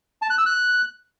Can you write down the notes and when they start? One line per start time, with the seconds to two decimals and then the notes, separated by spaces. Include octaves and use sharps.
0.22 A5
0.30 F#6
0.38 E6
0.46 F#6